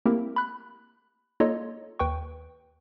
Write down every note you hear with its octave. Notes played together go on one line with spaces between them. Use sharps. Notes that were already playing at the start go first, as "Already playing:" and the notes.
A3 A#3 C4 E4 G4 A#4
B5 F#6
A#3 D#4 F4 A4 C#5 D#5
D#2 B4 G5 C#6